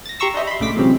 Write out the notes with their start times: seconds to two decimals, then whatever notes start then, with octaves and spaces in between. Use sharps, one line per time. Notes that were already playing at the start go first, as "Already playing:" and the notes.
0.06 A6 A#6
0.19 G4 A#5 C6 C#6 E6 A#6
0.34 D4 C5 D#5 E5
0.47 B5 C6
0.60 A#1 C#3 A3 D6 B6
0.76 C3 E3 F#3 G#3 C4 C#4